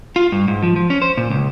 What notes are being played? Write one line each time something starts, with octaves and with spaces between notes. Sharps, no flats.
F4
G2
G#2
F3
F3
C#4
C5
A#2
C#2